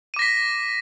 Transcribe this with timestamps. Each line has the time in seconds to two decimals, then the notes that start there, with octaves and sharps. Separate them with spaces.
0.14 D#7
0.16 D6
0.19 A#6
0.22 B6